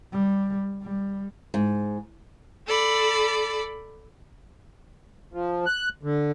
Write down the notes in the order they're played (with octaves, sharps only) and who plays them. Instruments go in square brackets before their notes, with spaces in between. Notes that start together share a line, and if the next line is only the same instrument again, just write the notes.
[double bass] G3
G3
[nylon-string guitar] G#2
[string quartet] A4 D5 B5
[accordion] F3
F#6
D3